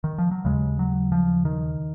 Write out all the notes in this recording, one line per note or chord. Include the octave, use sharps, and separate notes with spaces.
D#3
F3
F#3
D#2 C#3 G#3
F#3
F3
D#3